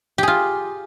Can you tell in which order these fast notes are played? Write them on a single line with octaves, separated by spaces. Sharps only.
G4 G#4 F4